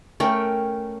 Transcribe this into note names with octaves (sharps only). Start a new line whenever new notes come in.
A3 C#4 A#4 G5